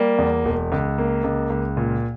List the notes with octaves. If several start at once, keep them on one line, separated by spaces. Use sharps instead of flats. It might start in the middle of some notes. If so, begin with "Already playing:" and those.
Already playing: G3 A#3
E2
E1
C#2
A#3
C#2
C#2
A#2